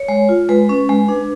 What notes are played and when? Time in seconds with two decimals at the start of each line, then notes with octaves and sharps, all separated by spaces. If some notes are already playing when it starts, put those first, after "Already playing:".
Already playing: C#5
0.09 G#3
0.29 F4
0.49 G#3 B4
0.69 C#4
0.89 G#3
1.09 D4